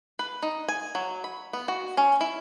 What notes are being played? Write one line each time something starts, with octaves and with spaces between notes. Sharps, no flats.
B4
D#4
G#5
F#3
B5
B3
F#4
C#4
E4